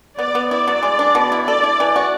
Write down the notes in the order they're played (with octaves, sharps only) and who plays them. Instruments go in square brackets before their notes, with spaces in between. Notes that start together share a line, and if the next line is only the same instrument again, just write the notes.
[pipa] B3 [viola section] D5
[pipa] B3
[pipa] E4 [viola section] D5
[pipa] F#3
G#3
D4
B2
E4
[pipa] A4 [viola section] D5
[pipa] E4
E3
F#4